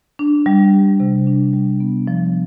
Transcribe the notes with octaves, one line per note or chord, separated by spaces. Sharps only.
D4
G3
G4
C3
D4
G3
B3
F3